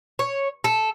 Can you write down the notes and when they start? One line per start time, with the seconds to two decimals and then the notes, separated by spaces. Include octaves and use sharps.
0.19 C#5
0.64 A4